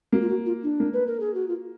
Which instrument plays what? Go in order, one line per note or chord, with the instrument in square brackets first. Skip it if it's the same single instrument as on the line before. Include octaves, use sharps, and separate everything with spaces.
[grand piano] A#3 [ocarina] F#4
[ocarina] F4
F#4
F4
D4
[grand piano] A#3
[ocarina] B4
A#4
G#4
F#4
F4